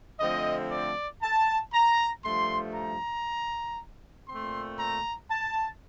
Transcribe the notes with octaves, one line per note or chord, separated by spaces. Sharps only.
D3 F3 A3 C4 D#5
D5
A5
A#5
G2 F3 A3 C6
A#5
A#2 A3 C4 C6
A#5
A5